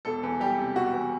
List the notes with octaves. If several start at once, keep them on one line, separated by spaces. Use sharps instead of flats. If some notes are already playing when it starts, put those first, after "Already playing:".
E1 A4
E2
G3 G4
C3
E1 F#4
E2